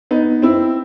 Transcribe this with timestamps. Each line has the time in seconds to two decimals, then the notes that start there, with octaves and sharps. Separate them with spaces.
0.11 B3 D#4
0.42 C4 E4